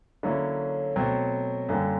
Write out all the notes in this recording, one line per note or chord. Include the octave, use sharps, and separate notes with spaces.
D3 F#3 A#3 C#4 E4
B2 F#3 A3 C4
F#2 D3 G3 A#3